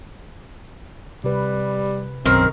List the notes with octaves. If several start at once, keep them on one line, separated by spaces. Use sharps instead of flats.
C3 G3 B4
B1 F#2 D#3 C4 A#4